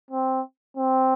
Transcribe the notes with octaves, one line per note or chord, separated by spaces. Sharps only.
C4
C4